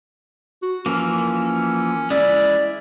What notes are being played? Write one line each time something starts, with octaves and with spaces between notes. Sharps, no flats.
F#4
E3 F3 A#3 C#4
G#3 E4 D5